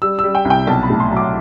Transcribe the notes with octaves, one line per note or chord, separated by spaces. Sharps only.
G3 E6
G3 E6
G5
C2
G5
B1 A5
B5
A2
C6
F#3
D6